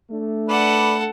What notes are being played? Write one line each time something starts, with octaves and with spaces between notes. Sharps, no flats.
A3 D4
A4 B4 D5 F#5